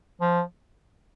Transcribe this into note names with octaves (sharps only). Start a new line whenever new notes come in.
F3